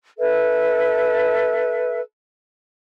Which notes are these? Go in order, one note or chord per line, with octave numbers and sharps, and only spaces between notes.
A4 B4 E5